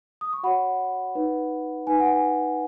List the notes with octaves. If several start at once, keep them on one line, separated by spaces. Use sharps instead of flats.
D#6
C#6
F#4 C#5 F#5 B5
D#4 B4
D#4 B4 G#5
F#5
G#5